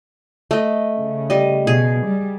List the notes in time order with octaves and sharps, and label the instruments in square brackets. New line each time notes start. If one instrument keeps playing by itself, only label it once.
[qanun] A3 D#5
[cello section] C#3
[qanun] G3 D#5
[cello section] B2 [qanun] G#4
[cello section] G3